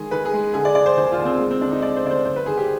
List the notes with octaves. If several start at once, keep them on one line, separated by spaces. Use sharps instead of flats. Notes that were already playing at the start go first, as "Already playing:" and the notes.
Already playing: D#3 G#3 G#4
D#3 B4
G#4
G#3
D3 G#4
D5
D3 D5
C5
D#2 C5
F4
D#2
C4
G#3
C4
D3 D4
D#4
G#3 D5
C5
D2 D5
C5
G1 C5
B4
D#3 G#4
G4